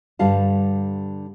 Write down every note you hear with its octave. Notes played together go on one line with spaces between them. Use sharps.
G2 D3 G3 F5 A5